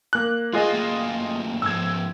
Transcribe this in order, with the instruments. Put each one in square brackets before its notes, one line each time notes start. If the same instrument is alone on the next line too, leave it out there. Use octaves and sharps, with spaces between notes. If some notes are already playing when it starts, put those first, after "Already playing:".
[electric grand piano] A#3 F#6
[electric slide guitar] G#3 F5 [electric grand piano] F4 G#4 D#5
[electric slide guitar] F#3 A3 A#3
[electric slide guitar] G#2 F3 [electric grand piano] E6 G#6